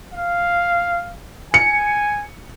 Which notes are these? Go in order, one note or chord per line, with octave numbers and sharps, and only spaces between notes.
F5
G#5 C#7